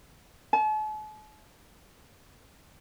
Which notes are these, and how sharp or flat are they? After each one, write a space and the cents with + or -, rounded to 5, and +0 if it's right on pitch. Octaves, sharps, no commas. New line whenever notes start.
A5 -45